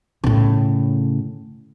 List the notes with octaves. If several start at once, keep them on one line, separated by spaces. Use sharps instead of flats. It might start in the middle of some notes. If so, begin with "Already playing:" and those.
A2 C#3